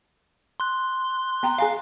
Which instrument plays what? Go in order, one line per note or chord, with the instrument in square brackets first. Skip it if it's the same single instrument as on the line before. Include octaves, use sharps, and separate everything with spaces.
[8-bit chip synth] C6 F#6
[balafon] B3 G5 A#5
[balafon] G#4 G#5 A#5 [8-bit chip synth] F5